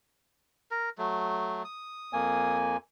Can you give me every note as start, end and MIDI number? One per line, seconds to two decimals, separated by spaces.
0.71 0.90 70
0.98 1.63 54
0.98 1.63 57
1.65 2.57 87
2.13 2.77 41
2.13 2.77 58
2.13 2.77 80